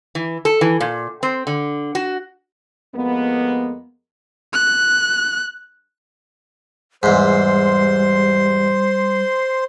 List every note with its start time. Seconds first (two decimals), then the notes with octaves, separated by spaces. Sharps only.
0.15 E3
0.45 A4
0.61 E3
0.80 A#2
1.23 C4
1.47 D3
1.95 F#4
2.95 F2 G#3 A#3 B3
4.54 F#6
7.03 E2 G#2 G3 C5 C6